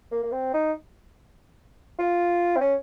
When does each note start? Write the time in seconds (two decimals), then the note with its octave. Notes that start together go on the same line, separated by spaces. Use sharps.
0.11 A#3
0.23 A#3
0.32 C4
0.54 D#4
1.99 F4
2.56 C4
2.61 C#4